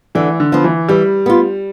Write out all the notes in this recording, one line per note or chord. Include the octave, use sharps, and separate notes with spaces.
D3 E3
D3
F3 B3 F4
E3
E3 G3
B3 F4